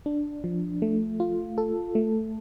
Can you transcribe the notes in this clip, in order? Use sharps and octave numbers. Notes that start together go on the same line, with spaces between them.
D4
F3
A3
F4
A4
A3